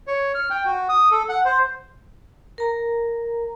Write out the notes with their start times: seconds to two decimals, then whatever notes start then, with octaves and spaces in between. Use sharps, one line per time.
0.07 C#5
0.35 F6
0.50 G5
0.65 F#4
0.89 D#6
1.11 A4
1.29 F#5
1.45 C5
2.58 A#4 A#5